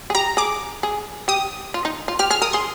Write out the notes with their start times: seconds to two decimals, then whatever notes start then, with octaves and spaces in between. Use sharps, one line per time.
0.10 G#4
0.15 G4 A#5
0.37 G#4 D6
0.83 G#4
1.28 G4 D#6
1.74 F4
1.85 D#4
2.08 F4
2.19 G4 F6
2.30 G#4 F6
2.42 A#4 D#6
2.53 G#4 C6